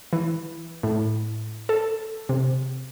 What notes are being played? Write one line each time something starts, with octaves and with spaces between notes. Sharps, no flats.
E3
A2
A4
C3